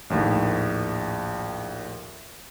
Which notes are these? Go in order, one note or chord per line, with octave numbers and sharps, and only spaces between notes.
A#1 D#2 A2